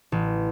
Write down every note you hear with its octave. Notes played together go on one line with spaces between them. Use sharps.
A1